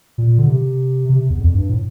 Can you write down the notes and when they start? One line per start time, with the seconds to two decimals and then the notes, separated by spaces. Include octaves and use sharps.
0.18 A#2
0.38 D3
0.48 C3
1.09 C3
1.30 E2
1.40 F2
1.55 G2
1.69 A2